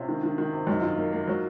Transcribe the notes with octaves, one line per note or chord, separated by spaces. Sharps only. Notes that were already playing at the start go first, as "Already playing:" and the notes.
Already playing: C3 C#4 F4
D#3
D#3
D#3
C3
F#2 D#4
D#3 F4
A#3 D#4
A#3
F#3